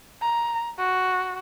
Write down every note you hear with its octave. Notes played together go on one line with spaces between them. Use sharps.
A#5
F#4